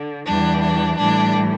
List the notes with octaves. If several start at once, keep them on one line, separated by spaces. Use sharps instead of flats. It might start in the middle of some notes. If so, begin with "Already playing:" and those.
Already playing: D3
E2 E3 G3 D4
D4
A2 E3 G3 D4